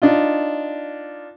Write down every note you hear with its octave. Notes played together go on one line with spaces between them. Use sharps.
D4 D#4 F4